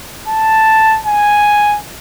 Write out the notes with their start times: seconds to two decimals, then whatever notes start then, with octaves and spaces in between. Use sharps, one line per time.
0.28 A5
1.06 G#5